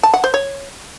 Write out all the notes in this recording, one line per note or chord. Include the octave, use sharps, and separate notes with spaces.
A5
F#5
C5
C#5